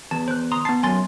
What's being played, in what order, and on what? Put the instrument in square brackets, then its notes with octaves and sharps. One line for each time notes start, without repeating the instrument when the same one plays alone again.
[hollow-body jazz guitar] E2 [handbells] A5
[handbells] C5 F#6
A#5 C6 D#6
[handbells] B3 C7 [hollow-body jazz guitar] A5
[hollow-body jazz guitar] F#2 [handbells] G#5 C6 A6